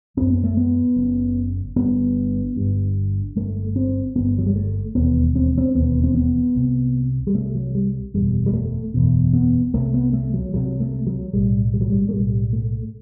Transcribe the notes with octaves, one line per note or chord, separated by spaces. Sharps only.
F#1 F#2 C4
B3
A3
B3
F#1 F#2
G1 G2 B3
G1 G2
G1 G2 A3
C4
G1 G2 B3
F#3
G3
A3
E1 D#2 B3
C4
C4
E1 D#2 B3
C4
B3
C2 C3
G3
C2 C3 A3
F#3
G3
F#1 E2 B2 G3
G3
A3
F#1 E2 B2
B3
C2 C3 A3
B3
A3
F#3
C2 C3 F#3
A3
F#3
B1 A2 G3
G3
F#3
G3
A3
B1 A2 G3
A3